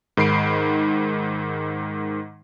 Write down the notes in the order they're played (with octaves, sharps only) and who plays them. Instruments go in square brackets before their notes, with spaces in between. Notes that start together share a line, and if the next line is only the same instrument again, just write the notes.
[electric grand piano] G#2 D#3 B5 C7 D7